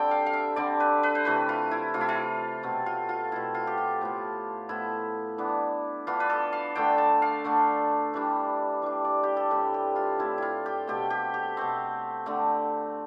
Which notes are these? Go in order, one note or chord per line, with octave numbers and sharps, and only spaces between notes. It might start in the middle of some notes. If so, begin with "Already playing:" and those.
Already playing: D3 G3 C4 G5 A5
F5
F5
E5
D3 G3 C4 D5
B4
B4
C5
C3 E3 A3 B4
F4
E4
C3 E3 A3 F4
E4
F4
B2 A3 C4
F4
F4
B2 A3 C4 E4
F4
G4
F4
A2 F3 B3
A2 F3 B3 E4
E3 B3 D4
E3 B3 D4 F4
B4
A4
F5
D3 A3 D4 G5
A5
F5
D3 A3 D4
E3 G3 D4
E3 G3 D4
D5
G4
A4
A2 G3 C4 B4
G4
F4
A2 G3 C4 E4
E4 F4
G4
B2 A3 C4 G4
G4
G4
B2 A3 C4
D3 A3 C4